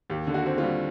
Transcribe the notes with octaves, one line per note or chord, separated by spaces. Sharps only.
D#2 G4
D3
F#4
C4
F4
G3